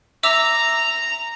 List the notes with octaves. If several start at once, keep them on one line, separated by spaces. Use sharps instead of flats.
E5 A#5 D6 E6